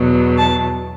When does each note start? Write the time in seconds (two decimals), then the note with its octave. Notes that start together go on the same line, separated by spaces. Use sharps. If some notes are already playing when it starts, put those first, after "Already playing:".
Already playing: E2 B2 F#3
0.38 A5